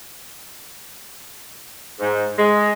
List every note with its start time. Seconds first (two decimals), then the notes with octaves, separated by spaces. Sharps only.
2.00 G#2
2.38 G#3